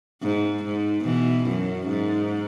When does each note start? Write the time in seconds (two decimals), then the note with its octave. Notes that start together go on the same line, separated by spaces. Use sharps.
0.22 G#2
0.64 G#2
1.04 B2 E3
1.46 F#2
1.88 G#2